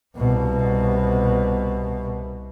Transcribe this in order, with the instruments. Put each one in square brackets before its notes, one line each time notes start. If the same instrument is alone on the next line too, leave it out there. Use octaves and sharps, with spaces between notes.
[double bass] C2 B2